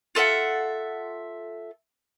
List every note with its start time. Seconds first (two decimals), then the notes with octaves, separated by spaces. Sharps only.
0.15 F4 A4 E5 F#5